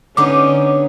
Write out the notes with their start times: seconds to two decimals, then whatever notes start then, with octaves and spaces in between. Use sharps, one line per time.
0.17 D3 B3 C#4 D#4 D6